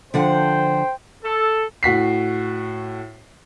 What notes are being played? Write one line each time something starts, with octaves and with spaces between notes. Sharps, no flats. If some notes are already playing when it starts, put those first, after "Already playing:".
D3 F3 C5 F#5 G5
A4
A2 F#4 B6 C7